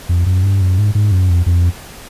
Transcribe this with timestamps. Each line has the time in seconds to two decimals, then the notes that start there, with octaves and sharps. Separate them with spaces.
0.09 F2
0.26 F#2
0.43 G2
0.61 F#2
0.78 G#2
0.95 G#2
1.12 F#2
1.30 F2
1.46 F2